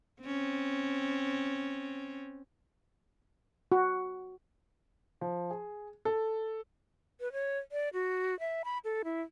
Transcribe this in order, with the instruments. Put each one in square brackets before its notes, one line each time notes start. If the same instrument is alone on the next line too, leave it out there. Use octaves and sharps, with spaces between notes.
[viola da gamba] C4 C#4
[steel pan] F#4
[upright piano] F3
G#4
A4
[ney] B4
C#5
D5
F#4
E5
B5
A4
E4